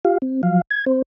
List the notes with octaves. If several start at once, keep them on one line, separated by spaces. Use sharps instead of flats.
F4 G4 F5
C4
F3 F#3 F5
G#6
C4 C5